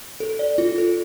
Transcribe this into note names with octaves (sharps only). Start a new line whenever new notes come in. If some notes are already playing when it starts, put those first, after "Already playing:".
A4
D5
F4
A4